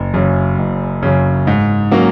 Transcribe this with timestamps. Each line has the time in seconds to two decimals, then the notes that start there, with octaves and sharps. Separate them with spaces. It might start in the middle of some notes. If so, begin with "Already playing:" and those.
Already playing: F#1
0.14 F#2 C#3
0.58 F#1
1.03 F#2 C#3
1.47 G#2
1.91 F#3 A#3 C#4